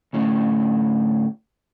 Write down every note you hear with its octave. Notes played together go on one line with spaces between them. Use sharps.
D2 A2 C#4